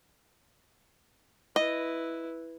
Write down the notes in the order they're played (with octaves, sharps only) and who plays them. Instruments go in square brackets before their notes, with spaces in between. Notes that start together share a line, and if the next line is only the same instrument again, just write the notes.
[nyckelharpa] E4 B4 [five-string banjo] D#5